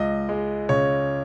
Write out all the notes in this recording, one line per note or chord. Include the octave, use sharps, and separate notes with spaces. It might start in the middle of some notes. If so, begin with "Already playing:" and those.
Already playing: C#2 D#5
G#3
C#3 C#5